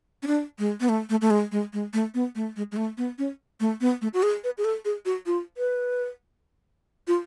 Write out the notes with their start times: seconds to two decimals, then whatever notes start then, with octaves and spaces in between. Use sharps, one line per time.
0.23 C#4
0.27 D4
0.59 G#3
0.81 B3
0.89 A3
1.10 A3
1.21 A3
1.30 G#3
1.52 G#3
1.73 G#3
1.93 A3
2.14 B3
2.35 A3
2.56 G#3
2.72 G#3
2.77 A3
2.97 B3
3.18 C#4
3.60 A3
3.81 B3
4.01 A3
4.14 F#4
4.23 G#4
4.44 B4
4.58 G#4
4.64 A4
4.85 G#4
5.05 F#4
5.26 F4
5.57 B4
7.07 F4